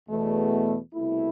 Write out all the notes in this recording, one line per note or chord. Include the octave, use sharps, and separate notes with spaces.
E2 B2 A3
C2 B2 A3 E4